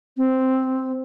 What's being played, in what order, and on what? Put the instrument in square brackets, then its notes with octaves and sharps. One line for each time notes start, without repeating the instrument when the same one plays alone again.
[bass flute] C4